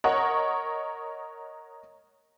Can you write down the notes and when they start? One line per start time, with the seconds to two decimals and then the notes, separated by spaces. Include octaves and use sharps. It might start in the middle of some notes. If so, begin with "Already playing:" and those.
0.04 A#4 C#5 D#5 F#5